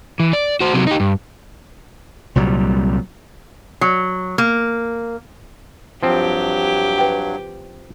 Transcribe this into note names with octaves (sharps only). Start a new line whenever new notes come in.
E3
D5
F#4 C5
C3 F#3
D#4 G4
G2
C2 A#2 F#3 G3
F#3
A#3
G2 F3 F#3 C4 G4
B4 G5